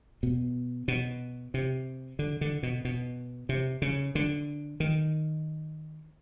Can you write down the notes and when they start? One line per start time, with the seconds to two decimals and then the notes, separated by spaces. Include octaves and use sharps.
0.23 B2
0.88 B2
1.54 C3
2.19 D3
2.41 D3
2.63 B2
2.85 B2
3.49 C3
3.82 C#3
4.15 D3
4.80 D#3